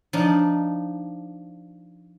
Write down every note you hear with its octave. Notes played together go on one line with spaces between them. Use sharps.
F3 D4 D#4